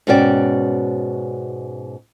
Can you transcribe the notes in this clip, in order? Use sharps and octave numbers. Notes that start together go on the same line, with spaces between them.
G#2 B2 C#4 F#4 D5 G5